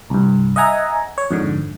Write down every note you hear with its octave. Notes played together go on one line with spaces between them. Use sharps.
C2 G2
D#5 E5 F#5 G#5 A#5
C#5
F2 G#2 D3